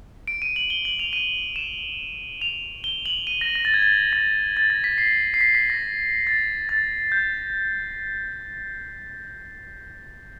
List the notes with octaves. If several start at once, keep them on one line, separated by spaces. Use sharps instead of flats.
D7
D#7
F#7
G7
F#7
F7
D#7
E7
F7
G7
F#7
D#7
A#6
A#6
A6
G#6
A6
A#6
A6
A#6
B6
C7
C7
B6
B6
A#6
A6
A6
G6